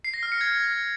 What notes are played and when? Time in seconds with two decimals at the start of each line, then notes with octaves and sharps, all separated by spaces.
0.04 C7
0.14 A#6
0.23 F6
0.32 C#7
0.41 G#6